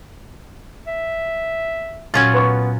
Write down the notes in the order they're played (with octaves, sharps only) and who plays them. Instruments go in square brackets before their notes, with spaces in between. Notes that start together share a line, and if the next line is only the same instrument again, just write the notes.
[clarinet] E5
[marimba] A#2 G#6 [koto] F#3 C#4 F4 [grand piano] A6
[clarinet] B3 [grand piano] B4 C#6